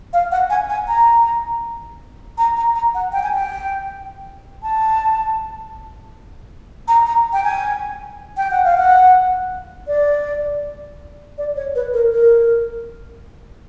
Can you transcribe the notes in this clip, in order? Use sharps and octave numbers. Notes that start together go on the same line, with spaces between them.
F5
F#5
G#5
G#5
A#5
A#5
A#5
A#5
F#5
G5
G#5
G5
A5
A#5
A#5
G5
G#5
G5
F#5
F5
F#5
D5
D5
C#5
B4
A#4
A#4